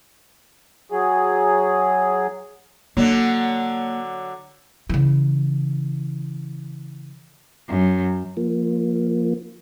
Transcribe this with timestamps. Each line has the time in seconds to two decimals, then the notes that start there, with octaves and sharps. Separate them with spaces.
0.92 F#3 G#4
2.97 D3 F#3 A#3
4.89 C#3 E3
7.68 F#2
8.37 F3 A#3